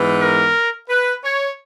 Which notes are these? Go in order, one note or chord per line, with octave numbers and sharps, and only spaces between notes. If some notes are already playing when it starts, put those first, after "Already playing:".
Already playing: G#2 E3 B3
A#4
B4
C#5